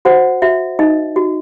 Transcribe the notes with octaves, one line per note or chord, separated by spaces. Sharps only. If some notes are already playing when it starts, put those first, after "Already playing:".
F#4 C5 F#5
F#4 E5
D#4 D#5
F#4